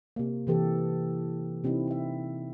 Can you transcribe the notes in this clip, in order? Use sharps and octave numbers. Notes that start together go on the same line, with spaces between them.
C3 A#3
C3 E3 G4 A4
C3 C4 D#4 E4
E4 E5